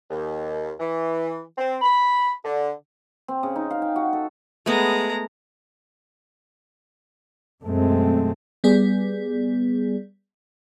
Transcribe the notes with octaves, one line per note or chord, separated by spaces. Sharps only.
D#2
E3
C4
B5
D3
C4
C#3
D#4
F5
G5
F#4
A4
G#3 A3 B3 A#5
F#2 B2 G#3 A3 C4
G3 B3 G#4 D5